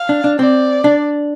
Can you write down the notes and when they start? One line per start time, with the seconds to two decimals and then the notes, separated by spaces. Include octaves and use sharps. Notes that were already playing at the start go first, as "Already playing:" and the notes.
Already playing: F5
0.09 D4
0.24 D4
0.39 C4 D5
0.84 D4